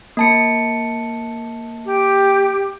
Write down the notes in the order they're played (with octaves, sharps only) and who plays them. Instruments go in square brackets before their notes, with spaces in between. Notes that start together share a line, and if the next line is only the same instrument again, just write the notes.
[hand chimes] A#3 A5 C#7
[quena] G4